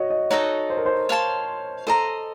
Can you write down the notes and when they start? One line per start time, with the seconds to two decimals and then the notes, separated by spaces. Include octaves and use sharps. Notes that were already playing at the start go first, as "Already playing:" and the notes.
Already playing: F#4 C#5 D#5
0.10 D#5
0.31 D#4 F#4 A4 C#5 D#5
0.70 C5
0.77 A#4
0.86 C5
1.09 C#5 F5 A5 C6
1.87 A4 C5 D#5 A#5